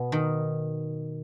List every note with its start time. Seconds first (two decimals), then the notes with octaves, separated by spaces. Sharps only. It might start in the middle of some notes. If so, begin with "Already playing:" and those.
Already playing: B2 B3
0.12 D#3